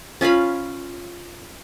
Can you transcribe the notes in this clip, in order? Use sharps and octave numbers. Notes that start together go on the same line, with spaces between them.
C#4 F4 F5 B5